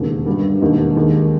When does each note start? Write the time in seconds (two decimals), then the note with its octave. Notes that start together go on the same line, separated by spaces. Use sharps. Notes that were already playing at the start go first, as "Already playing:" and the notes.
Already playing: E1 D#2 C#3
0.26 G1 G2 G3
0.61 E1 D#2 D#3
0.96 D#2 D#3 G#3